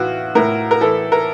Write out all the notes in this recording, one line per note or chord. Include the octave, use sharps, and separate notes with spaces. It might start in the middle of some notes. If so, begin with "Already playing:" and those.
Already playing: A2 E3 F4 F#4
A2 A#4
A#4
E3 A4
A#4